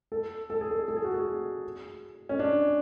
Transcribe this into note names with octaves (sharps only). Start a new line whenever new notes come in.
A4
A4
G#4
A4
A4
G#4
F#4
G#4
C#4
D4